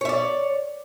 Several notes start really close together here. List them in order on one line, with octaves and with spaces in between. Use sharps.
C#5 E5 D5